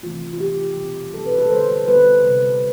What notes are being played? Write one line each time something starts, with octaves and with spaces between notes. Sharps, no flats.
C3 E3 A3 C4 F4
F4
C3 E3 A3 C4 G4
B2 G3 C4
B2 G3 C4 A4
B4
A4
D3 G3 B3 C5
D3 G3 B3 B4
C3 G3 C4